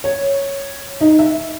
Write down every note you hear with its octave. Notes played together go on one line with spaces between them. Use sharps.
C#5
D#4
E5